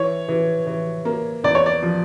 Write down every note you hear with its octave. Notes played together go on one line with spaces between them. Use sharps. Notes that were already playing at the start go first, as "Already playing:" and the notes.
Already playing: E3 C#5
E3
E3
A#3
E2 D5
C#5
D5
F3